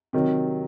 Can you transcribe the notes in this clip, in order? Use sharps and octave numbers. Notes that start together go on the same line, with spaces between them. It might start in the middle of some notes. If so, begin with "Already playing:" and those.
C3 D#3 F#3